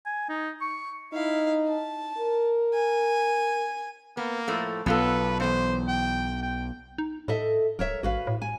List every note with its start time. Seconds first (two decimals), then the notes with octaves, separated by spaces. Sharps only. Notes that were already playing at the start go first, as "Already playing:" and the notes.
0.06 G#5
0.29 D#4
0.61 C#6
1.13 D#4 E4 F5
1.68 A5
2.18 A#4
2.73 G#5
4.17 A#3 B3
4.48 A2 F3 A3
4.86 B1 B3 F4 A4 B4
5.40 E2 G2 C5
5.88 G5
6.42 G5
6.98 D#4
7.28 A2 A4 D#5 E5
7.79 D1 A#4 C#5 E5
8.03 A1 F#4 B4 F5
8.27 A2
8.42 G#5